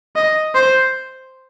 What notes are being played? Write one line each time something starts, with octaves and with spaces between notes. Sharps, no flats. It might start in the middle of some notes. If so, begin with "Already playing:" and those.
D#5
C5